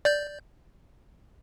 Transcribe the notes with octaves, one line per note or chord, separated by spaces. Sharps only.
D5 G6